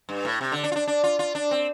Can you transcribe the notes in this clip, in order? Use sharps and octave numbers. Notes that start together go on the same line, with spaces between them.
G2
A2
C3
D3
D4
F4
D4
D4
F4
F4
D4
C4